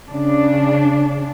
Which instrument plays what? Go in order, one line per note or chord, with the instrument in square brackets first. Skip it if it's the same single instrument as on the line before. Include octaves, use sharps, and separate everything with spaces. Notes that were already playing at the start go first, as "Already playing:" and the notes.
[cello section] C#3 D4